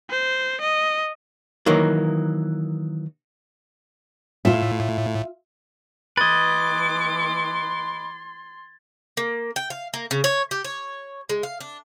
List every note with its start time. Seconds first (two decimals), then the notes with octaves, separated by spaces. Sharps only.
0.11 C5
0.61 D#5
1.66 D#3 E3 F#3 A#3
4.45 A2 F4 E5
6.17 E3 B4 D#5 C6 D6 G#6 A6
9.17 A#3
9.56 G5
9.70 F5
9.94 A#3
10.11 C#3
10.24 C#5
10.51 G4
10.65 C#5
11.29 G#3
11.43 F5
11.61 D4